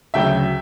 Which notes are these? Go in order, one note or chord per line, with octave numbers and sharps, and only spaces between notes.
D2 C#3 F#3 E5 G5